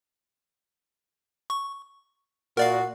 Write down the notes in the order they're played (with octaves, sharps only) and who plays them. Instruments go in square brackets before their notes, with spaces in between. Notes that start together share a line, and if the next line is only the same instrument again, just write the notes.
[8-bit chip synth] C#6
[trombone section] A#2 F#4 [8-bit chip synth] A#4 D5 F5